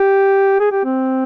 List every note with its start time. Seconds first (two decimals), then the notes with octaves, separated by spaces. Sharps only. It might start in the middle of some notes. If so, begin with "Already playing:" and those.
Already playing: G4
0.60 G#4
0.71 G4
0.84 C4